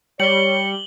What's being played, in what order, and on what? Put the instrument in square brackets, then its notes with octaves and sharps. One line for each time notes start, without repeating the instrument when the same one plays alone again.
[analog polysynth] G3 [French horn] C#5 [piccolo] C#7 [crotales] F#7 G7